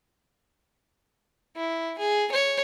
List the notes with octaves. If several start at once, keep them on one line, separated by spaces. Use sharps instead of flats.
E4
G#4
C#5